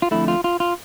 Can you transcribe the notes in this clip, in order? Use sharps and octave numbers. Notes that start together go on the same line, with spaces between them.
F4
F2 D3 A3 E4
F4
F4
F4